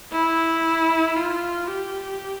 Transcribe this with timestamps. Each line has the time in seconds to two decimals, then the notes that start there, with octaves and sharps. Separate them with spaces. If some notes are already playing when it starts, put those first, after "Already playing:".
0.13 E4
1.17 F4
1.68 G4